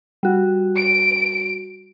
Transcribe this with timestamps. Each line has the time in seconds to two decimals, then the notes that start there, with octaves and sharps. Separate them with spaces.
0.23 G3 F#4
0.77 D7